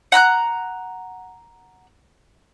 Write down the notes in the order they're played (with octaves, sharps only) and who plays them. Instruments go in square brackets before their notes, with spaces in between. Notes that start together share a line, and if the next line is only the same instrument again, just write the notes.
[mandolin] F#5 A#5 F6 F#6